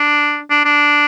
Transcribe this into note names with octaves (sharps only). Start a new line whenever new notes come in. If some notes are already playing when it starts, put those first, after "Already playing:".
Already playing: D4
D4
D4